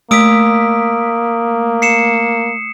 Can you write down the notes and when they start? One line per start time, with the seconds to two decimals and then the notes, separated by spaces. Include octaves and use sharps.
0.11 A3 A#3 D#6 E6 B6 D7
1.82 C7 C#7 E7